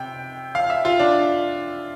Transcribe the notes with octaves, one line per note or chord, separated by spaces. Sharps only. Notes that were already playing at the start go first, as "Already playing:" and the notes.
Already playing: C3 G5
F5
E5
F4
D4